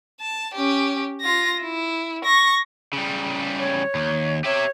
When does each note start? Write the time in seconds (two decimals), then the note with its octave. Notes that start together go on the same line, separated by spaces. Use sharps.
0.20 A5
0.55 C#4 G4
1.21 F4 A#6
1.61 E4
2.24 C#6 A#6
2.93 C#3 G3
3.59 C#5
3.95 D#2
4.45 G4 C#5 E5